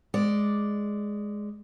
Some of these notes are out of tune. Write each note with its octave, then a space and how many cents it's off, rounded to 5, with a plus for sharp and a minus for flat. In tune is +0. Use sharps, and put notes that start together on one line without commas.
G#3 +0 D5 +0